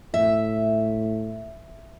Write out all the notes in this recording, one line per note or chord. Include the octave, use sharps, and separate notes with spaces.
A2 E5